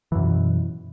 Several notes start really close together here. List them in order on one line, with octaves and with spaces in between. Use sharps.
E3 F#2 B2